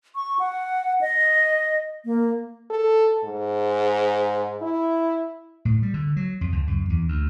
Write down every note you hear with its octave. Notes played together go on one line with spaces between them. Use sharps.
C#6
F#5
D#5
A#3
A4
G#2
E4
A2
G3
D3
F#3
F2
C#2
F#2
E2
D2